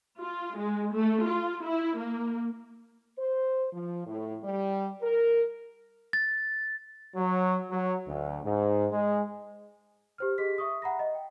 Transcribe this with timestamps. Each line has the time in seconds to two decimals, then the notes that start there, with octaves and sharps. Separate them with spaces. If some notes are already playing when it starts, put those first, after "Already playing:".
0.20 F4
0.57 G#3
0.95 A3
1.27 F4
1.63 E4
1.98 A#3
3.18 C5
3.73 F3
4.06 A2
4.43 G3
5.02 A#4
6.13 A6
7.16 F#3
7.71 F#3
8.07 D2
8.45 G#2
8.92 G#3
10.18 G4 C5 F6
10.38 G4 G#4 D#5 C6 B6
10.58 E5 C#6 D#6
10.82 E5 F#5 A#5 B5 A#6
10.99 D#5
11.15 G5